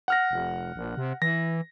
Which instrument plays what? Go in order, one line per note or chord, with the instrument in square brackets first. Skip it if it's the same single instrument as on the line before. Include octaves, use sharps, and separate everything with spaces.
[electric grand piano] F#5 F6 A#6
[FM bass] F1
A#1
C3
[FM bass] E3 [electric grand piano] A#6